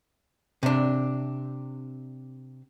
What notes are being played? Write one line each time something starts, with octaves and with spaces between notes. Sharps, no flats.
C3 D4